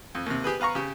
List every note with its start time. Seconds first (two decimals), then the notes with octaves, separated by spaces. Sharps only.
0.15 F2
0.26 D#2 C3
0.44 G4 G#4 B4
0.60 B3 B4 F5 A#5 C#6
0.75 C#3 G4